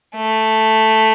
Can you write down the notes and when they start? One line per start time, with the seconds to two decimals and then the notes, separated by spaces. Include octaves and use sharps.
0.16 A3